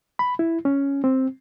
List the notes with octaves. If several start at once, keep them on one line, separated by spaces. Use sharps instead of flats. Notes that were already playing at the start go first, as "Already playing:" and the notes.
B5
E4
C#4
C4